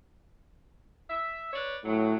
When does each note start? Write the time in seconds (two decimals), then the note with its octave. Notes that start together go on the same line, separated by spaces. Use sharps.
1.09 E5
1.53 B4 C#5 D5
1.85 A2 F#3